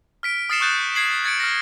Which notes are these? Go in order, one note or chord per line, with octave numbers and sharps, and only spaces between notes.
F6 B6 D7
D#6 F6 A6 C7 C#7 E7
C#6 D#6 F#6 G6 A6 E7
G#6 C7 F#7
G#6 A6 C#7 D7
F6 A#6